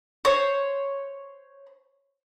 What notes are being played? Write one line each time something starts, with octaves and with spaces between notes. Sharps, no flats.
C5 C#5